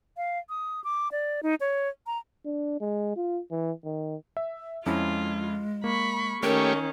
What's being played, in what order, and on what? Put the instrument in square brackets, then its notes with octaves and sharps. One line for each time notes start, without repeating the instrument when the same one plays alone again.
[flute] F5
D#6
D6
D5
D#4
C#5
A#5
[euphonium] D4
G#3
F4
E3
D#3
[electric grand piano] E5
[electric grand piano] F2 C#4 E4 [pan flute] G#3 [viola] F4
[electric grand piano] A#3 [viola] B5 C#6
[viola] D#3 C#4 [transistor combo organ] A3 G4 C#5 [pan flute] A#4